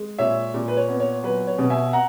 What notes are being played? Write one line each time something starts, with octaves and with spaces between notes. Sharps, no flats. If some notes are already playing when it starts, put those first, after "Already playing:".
Already playing: G#3
A#2 C#5 E5
A#2
B4
C#5
B3
C#5
F#3 B4
C#5
B2
E5 G#5
F#5 A#5